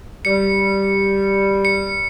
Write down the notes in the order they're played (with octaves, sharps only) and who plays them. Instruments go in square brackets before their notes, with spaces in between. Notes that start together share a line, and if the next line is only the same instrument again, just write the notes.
[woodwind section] G3 [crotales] C#7
[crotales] C#7